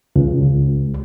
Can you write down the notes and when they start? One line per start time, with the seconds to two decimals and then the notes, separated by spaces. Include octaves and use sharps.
0.16 C#2